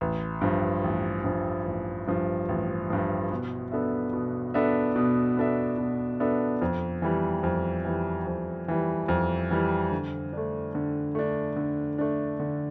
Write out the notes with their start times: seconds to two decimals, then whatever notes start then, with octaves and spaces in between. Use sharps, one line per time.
0.01 A1
0.41 G2 F3
0.84 A1
1.24 G2 F3
1.66 A1
2.07 G2 F3
2.49 A1
2.90 G2 F3
3.31 B2
3.72 B3 D4 A4 E5
4.13 B2
4.54 B3 D4 A4 E5
4.96 B2
5.37 B3 D4 A4 E5
5.78 B2
6.20 B3 D4 A4 E5
6.62 F2
7.02 E3 G3
7.43 F2
7.85 E3 G3
8.27 F2
8.68 E3 G3
9.08 F2
9.51 E3 G3
9.91 D3
10.33 A3 D4
10.75 D3
11.15 A3 D4
11.56 D3
11.98 A3 D4
12.40 D3